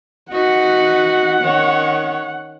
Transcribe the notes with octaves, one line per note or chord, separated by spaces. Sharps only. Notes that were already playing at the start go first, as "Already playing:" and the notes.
D#4 F#4 B4 F#5
D#3 C#4 C#5